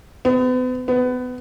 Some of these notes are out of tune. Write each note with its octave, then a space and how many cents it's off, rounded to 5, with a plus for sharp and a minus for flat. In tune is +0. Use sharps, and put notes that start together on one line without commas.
B3 +40
B3 +25